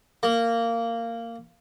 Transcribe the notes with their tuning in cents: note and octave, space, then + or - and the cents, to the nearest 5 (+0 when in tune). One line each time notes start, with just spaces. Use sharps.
A#3 -15